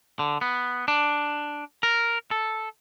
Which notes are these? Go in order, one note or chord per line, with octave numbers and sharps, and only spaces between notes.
D3
B3
D4
A#4
A4